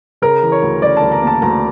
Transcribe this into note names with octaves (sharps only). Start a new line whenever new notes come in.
C#3 A#4
E3
C#5
D2
C#3 D5
A5
D2
A#5
A#3 A5
D2 A#5